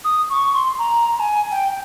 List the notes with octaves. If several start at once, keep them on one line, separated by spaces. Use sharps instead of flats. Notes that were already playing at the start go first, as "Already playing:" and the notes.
D#6
C#6
C6
A#5
A#5
G#5
G5